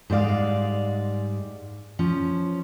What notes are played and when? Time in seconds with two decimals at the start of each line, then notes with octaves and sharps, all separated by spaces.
0.10 G#2 G3 G#3 D5 F5
1.99 F3 C#4